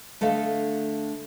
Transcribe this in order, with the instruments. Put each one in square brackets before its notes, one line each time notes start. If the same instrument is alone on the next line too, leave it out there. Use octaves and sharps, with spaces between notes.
[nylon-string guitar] D3 A3 A4 D#5 F5